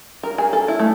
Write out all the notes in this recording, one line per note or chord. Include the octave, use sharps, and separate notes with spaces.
A#4
G#4
A4
E4
A3